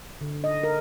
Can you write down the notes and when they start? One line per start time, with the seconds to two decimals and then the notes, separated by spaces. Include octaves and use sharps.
0.21 D3
0.44 D#5
0.64 A#4